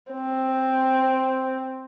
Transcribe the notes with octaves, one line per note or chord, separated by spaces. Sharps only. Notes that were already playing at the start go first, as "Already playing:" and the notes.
C4